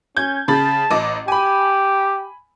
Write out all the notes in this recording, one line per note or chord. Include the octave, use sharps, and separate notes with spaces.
C#4 G6 G#6
C#3 A5 B5 A6
A1 D#5 D6
G4 G#5 B5